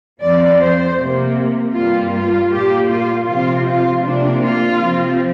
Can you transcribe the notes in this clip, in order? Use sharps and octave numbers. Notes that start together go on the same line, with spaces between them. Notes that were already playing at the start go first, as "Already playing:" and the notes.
F2 F3 C4 D5
C5
C3 A#3
G2 G3 A#3 F4
F4
A#2 A#3 G4
F4
C3 F3 C4 F4
F4
C3 A#3 D4
F4
C3 F3 C4